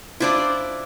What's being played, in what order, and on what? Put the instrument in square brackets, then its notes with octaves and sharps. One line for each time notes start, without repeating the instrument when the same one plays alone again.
[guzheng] D4 E4 [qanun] F4 C5 D5